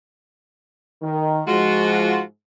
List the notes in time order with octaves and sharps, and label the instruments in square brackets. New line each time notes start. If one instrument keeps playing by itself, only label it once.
[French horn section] D#3
[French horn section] G#2 F3 G#3 [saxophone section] F4 F#4